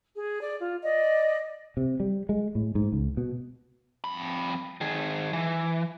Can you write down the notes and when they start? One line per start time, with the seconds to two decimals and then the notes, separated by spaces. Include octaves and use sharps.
0.15 G#4
0.40 D5
0.60 F4
0.84 D5 D#5
1.77 C3
2.00 G3
2.29 G#3
2.55 A2
2.75 G#2
2.92 C#2
3.17 B2
4.04 F2 B5
4.81 D#3 G#4
5.33 E3